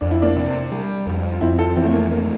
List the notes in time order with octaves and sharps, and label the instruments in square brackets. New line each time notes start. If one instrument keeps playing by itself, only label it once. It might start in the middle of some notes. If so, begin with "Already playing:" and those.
[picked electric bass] F2 [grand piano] D4
[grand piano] E4
A#3 D4
[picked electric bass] C3
G3
F2
[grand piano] F4
[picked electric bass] F2 [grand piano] C4 E4
[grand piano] F4 A4
[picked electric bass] E3 [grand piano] C4 E4
[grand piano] A3
A#3
[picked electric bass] A3 [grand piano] A#3